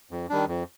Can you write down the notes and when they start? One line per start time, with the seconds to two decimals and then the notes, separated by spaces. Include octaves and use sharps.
0.11 F2
0.30 D#3 G3 D4
0.48 F2